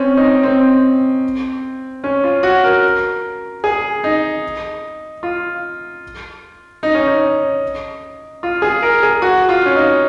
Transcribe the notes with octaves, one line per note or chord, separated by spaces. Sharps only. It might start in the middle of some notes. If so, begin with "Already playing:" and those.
Already playing: C4 C#4
D#4
C4
C#4
F4
F#4
A#4
G#4
D#4
F4
D#4
C#4
D#4
F4
G#4
A#4
G#4
F#4
F4
C#4
D#4